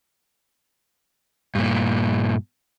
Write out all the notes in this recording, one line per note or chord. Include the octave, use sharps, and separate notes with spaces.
G2 A#2